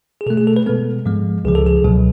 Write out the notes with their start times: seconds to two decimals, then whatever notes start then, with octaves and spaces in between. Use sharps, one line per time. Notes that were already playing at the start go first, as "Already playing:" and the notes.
0.21 G#4
0.26 B2 A4
0.30 A3
0.37 G#4
0.47 A4
0.56 B4
0.66 B2 G#3 B3 A4
1.06 G#2 F3 G#3
1.45 C#2 C#3 F3 G#4
1.55 A4
1.66 G#4
1.84 C#2 B2 F#3